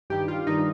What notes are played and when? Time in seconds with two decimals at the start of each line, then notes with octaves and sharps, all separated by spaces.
0.10 G2 D#3 G3 G4
0.28 F4
0.47 G2 D#3 G3 D#4